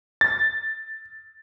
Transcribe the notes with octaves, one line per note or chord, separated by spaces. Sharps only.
A6